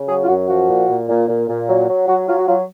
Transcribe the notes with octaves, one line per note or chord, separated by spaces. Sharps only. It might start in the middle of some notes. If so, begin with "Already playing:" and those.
Already playing: C#3
F#3 G#4
F4
F#2 F#4
F3 F#4
A#2
A#2
A#2
A#2
A#2
F#3
F#3
F#3 F#4
F#3 F4
F#4
F#3 F4